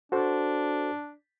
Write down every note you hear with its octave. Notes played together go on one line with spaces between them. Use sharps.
D4 F#4 A4 C5